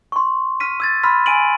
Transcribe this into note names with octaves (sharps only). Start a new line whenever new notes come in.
C6 C#6
C6 F6 B6 D#7
E6 G#6 A6
B5 C6 E6 F6 B6
G#5 E6 D7 D#7 F#7